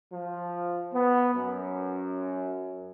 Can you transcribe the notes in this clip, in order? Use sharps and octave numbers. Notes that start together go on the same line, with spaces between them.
F3
B3
F#2